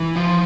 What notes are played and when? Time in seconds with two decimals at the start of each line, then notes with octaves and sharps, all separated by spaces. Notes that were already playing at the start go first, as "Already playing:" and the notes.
Already playing: E3
0.16 F3